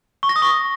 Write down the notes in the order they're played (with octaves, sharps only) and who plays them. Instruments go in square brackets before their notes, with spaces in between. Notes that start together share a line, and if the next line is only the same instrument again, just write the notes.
[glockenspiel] C#6
A#6
D#6
C#6